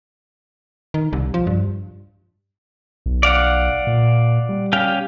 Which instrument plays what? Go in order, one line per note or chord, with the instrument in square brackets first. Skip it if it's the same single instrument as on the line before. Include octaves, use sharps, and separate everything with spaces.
[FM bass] D#3
C2
F3
G2
[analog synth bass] B1
[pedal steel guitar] D5 F5 F#5
[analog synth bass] A#2
G3
[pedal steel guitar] C#4 G4 F5